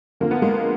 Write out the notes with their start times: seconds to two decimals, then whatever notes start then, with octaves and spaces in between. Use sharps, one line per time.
0.20 F2 D3 F3 A#3
0.31 B3
0.42 G#3 A#3